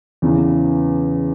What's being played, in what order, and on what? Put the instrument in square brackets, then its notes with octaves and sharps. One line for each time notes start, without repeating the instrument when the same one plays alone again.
[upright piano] E2 C#3 E3